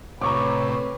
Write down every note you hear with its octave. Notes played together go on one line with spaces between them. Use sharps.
A2 C3 B4 C#5 A#5 C#6 D6